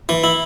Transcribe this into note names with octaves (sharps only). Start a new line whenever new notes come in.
E3
E4